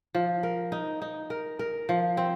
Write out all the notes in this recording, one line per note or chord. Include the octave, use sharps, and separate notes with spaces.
F3
A#4
D#4
D#4
A#4
A#4
F3
C4